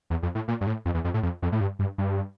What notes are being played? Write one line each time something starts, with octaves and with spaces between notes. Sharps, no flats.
E2
F2
A2
A#2
G2
A2
F2
E2
F2
A2
F2
F2
A2
G2
G2
G2